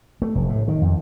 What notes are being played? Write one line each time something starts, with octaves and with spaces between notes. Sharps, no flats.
A3
F1
A2
D#3
F2